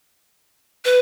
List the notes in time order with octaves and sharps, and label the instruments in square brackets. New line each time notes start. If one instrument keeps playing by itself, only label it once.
[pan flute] B4